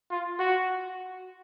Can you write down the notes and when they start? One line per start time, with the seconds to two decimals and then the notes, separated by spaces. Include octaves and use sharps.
0.10 F4
0.39 F#4